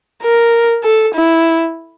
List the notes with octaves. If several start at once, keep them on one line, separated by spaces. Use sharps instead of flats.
A#4
A4
E4